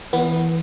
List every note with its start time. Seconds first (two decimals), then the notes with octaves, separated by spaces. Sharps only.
0.13 E3 B3